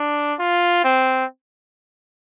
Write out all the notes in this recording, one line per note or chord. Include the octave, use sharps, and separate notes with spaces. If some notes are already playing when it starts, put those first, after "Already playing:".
Already playing: D4
F4
C4